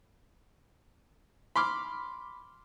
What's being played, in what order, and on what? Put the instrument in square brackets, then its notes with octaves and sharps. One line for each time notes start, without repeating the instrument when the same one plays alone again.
[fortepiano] B5 C6 D6 F6